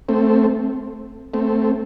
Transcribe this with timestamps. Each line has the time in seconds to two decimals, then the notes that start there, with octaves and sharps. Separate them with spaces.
0.09 A3 C4
1.34 A3 C4